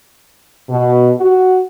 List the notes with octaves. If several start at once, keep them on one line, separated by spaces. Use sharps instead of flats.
B2
F#4